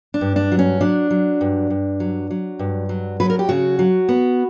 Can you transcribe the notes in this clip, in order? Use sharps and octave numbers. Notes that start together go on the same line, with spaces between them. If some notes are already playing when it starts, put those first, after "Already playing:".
D4
G2
D4
F#3
C#4
F#3 D4
F#3
G2
G2
F#3
F#3
G2
F#3
F#3 B4
A#4
G4
C#3 F#4
F#3
B3